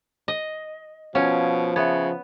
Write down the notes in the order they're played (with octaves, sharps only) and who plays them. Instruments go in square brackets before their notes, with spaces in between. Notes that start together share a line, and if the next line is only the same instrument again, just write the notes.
[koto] D#5
[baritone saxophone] B2 [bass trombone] F3 [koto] C#4 [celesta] F5 F#5 G#6
[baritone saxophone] C#3 [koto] B3 [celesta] E5 G#6